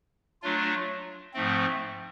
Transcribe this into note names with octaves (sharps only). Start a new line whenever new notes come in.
F#3 A3 D4 F4
G#2 F3 A3 C4